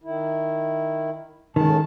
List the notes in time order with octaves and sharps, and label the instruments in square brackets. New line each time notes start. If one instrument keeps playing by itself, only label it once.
[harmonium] D#3 E4
[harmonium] A2 C#4 A5 [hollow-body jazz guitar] D#3 G#3